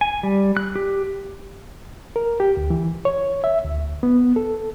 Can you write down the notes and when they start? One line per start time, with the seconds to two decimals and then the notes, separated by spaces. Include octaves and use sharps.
0.01 G#5
0.23 G3
0.57 F#6
0.76 G4
2.16 A#4
2.40 G4
2.57 D2
2.70 E3
3.05 C#5
3.44 E5
3.64 D2
4.03 B3
4.36 A4